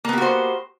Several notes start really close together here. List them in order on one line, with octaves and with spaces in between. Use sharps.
A#3 B3 G4 F#4 C5